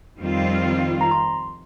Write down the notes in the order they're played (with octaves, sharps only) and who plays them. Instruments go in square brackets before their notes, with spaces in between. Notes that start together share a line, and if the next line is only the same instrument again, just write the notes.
[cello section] F2 D#3 G3 C4 F4
[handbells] A#5
C6